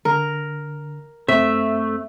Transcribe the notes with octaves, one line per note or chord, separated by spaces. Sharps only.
D3 A#4
F#2 A3 C4 E5